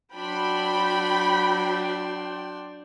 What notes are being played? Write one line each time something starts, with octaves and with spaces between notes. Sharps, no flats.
F#3 D4 G5 B5 C6